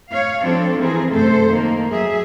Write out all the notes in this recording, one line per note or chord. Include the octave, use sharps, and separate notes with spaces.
C#5 F5
F3 C4 D4 A4
E3 C4 G#4 A#4
F#2 C3 A3 A4 C5
D#3 A#3
F#3 G#4 E5